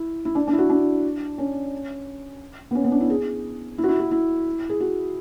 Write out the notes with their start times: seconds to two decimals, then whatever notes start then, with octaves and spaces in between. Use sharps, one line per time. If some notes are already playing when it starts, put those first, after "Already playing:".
Already playing: E4
0.25 E4
0.35 D4
0.47 D4
0.53 E4
0.58 F#4
0.70 D4
1.38 C#4
2.71 B3
2.75 C#4
2.84 B3
2.92 D4
3.00 E4
3.10 G#4
3.78 E4
3.84 F#4
3.89 E4
4.00 F#4
4.11 E4
4.69 G#4
4.80 F#4